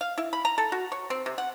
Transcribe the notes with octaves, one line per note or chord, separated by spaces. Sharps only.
F5
E4
B5
A#5
A4
F#4
C#5
C4
C3
F#5